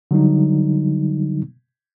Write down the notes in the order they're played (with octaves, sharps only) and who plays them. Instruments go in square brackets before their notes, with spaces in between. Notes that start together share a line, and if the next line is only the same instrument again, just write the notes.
[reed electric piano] D3 F#3 G3 D#4